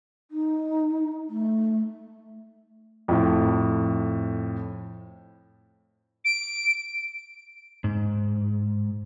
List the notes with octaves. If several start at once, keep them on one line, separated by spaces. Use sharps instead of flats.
D#4
A3
F2 A2
D7
G#2